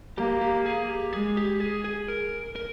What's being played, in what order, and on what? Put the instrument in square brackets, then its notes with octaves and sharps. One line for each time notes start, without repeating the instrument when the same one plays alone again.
[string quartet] A#3 [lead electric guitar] G4
[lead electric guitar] G4
G#4
G4
[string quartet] G#3 [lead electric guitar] G#4
[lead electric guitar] G4
G#4
G#4
A#4
A#4